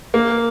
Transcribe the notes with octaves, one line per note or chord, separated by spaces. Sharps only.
A#3